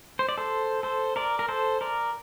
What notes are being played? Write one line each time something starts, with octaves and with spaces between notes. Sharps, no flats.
C5
D5
A4 C5
A4 C5
A#4 D5
A#4
A4 C5
A#4 D5